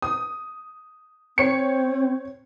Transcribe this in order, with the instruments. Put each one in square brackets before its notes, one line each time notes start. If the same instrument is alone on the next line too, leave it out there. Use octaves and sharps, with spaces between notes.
[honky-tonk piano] D#6
[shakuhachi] C4 [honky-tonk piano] C#5 C#7